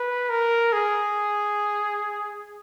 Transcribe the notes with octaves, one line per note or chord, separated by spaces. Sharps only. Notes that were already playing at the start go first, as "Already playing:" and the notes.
Already playing: B4
A#4
G#4